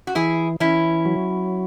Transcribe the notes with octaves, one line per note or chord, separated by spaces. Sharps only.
F#4
E3 E4 G#4
E3 C#4 E4
F#3